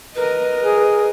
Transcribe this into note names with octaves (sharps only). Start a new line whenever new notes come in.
A#4 B4 D#5
G#4